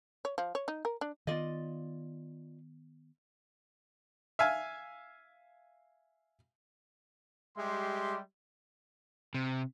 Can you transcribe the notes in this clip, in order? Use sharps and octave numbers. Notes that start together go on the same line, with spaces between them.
C#5
F3
C#5
D#4
A#4
D4
D#3 B3 F4 D5 D#5
E5 F5 G#5
G3 G#3 G4 E5 C6
C3